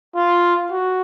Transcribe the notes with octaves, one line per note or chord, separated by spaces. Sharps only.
F4
F#4